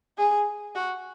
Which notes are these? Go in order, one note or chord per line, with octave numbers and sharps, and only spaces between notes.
G#4
F#4